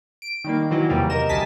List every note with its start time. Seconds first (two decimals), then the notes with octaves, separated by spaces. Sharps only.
0.22 D7
0.44 D#3 G3 A#3
0.70 D#3 E3 F#3
0.89 E2 C3 G3 A#3
1.10 A#4 D#5 E7
1.29 D2 G3 G#5 A5 B6